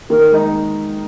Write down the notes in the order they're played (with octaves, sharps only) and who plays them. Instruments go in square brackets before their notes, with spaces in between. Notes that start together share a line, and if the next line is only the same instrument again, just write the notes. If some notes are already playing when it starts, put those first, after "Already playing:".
[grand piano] D#3 [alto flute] A#4
[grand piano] G#3 D#4